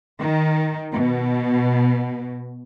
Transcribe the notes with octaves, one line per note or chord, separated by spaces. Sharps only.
D#3
B2